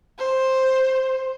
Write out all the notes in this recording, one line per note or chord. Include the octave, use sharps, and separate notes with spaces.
C5